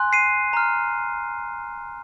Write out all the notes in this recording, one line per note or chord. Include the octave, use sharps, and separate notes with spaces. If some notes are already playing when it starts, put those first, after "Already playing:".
Already playing: G#5 C6 F#6
C7 D#7
A#5 F6